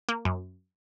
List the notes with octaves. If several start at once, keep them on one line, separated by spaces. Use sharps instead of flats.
A#3
F#2